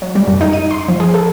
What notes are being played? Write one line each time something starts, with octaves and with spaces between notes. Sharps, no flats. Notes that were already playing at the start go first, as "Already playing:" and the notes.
F#3
G3
F#2
D#4
D#7
C6
F3
G#4
A4